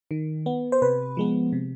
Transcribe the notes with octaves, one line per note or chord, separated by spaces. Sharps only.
D#3
B3
C5
C3 B4
F3 G#3 B3
C3